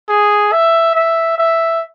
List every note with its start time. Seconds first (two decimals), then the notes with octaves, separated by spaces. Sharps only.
0.09 G#4
0.53 E5
0.95 E5
1.38 E5